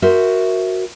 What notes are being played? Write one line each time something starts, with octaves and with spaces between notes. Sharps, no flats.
F#4 A#4 C5 E5